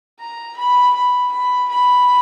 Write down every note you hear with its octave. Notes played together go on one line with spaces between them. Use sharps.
A#5
B5
B5
B5
B5